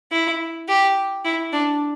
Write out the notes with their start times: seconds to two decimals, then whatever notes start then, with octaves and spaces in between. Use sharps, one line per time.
0.12 E4
0.68 G4
1.25 E4
1.53 D4